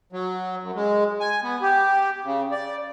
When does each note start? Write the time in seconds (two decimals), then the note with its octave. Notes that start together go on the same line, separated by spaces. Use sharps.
0.13 F#3
0.62 F#2
0.76 G#3
1.20 G#5
1.43 B3
1.62 G4
2.24 C#3
2.52 D5